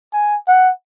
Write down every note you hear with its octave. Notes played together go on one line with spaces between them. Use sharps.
G#5
F#5